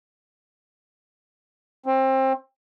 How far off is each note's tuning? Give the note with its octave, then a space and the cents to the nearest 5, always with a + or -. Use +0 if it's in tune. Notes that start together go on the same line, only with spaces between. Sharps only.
C4 +25